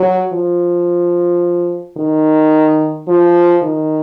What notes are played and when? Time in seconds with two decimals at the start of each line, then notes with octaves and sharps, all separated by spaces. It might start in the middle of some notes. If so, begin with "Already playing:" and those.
Already playing: F#3
0.33 F3
1.97 D#3
3.08 F3
3.63 D#3